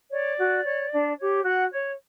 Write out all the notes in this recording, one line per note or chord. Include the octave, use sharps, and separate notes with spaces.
C#5 D5
F#4
C#5
D4
G4 C#5
F#4 F#5
C#5